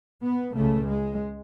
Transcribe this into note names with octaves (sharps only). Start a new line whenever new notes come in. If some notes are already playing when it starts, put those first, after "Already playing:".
B3
C#2 C#3 A3
G#3